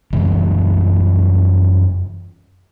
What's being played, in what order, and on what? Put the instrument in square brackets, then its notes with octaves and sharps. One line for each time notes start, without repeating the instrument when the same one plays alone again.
[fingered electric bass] F#2 C#3 E3 G3